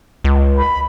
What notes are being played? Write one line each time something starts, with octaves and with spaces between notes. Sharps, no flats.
C#2
B5